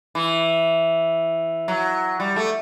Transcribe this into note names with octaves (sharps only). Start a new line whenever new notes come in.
E3
F#3
G3
A3